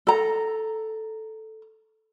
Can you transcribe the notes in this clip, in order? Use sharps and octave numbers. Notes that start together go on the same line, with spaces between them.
A4 A#5